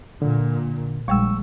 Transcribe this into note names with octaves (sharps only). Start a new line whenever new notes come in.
A#2 D3
A#1 G3 G#3 G5 C#6 E6